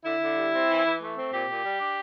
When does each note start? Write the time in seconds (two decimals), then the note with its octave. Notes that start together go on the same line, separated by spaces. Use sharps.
0.04 D3 E4
0.21 D3
0.37 G3
0.54 C4
0.69 E3
0.85 E3
1.01 A3
1.17 C4
1.32 A#2 G4
1.49 A#2
1.64 G3
1.81 D4